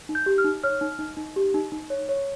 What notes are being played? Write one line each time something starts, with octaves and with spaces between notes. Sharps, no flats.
D#4
G6
G4
F6
D#4
C#5 F6
D#4
D#4
D#4
G4
D#4
D#4
C#5
C#5